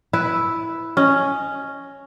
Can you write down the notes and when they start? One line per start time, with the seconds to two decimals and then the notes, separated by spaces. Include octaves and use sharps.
0.13 E4 B4
0.97 C#4 D#5